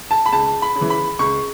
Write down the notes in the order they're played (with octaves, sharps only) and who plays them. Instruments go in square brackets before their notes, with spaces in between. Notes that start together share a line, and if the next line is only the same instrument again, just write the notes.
[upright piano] A5
B5
C#2 A5
B5
C#3
E3
B5
C#2 C#6